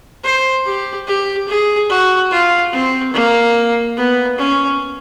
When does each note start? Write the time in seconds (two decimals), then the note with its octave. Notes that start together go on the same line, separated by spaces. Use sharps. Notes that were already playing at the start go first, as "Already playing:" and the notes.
0.24 C5
0.66 G4
1.07 G4
1.48 G#4
1.90 F#4
2.31 F4
2.73 C4
3.13 A#3
3.97 B3
4.38 C#4